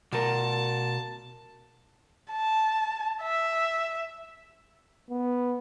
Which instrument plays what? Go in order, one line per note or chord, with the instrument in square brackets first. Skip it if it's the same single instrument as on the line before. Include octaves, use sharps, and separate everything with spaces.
[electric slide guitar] B2 A#4 [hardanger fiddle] A5
[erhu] A5
E5
[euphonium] B3